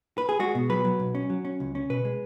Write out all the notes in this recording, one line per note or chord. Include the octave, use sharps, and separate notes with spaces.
B4
G#4
G#3 F#4
B2
F#3 B4
F#3
B1
C#4
F#3
C#4
C#2
C#4
B2 B4
G#3